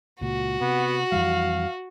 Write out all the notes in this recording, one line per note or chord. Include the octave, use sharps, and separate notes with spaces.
C#2 A#2 F#4
C3 B3
F2 E3 G3 F5